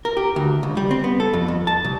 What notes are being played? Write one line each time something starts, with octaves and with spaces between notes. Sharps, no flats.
A#4
G4
D2
C#2
G3
C4
B3
A4
F2
F2
A5
C2